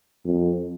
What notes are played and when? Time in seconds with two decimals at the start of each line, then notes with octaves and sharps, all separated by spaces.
0.25 F2